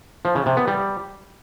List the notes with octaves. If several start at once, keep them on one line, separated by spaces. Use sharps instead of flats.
F3
C#3
C3
B3
G3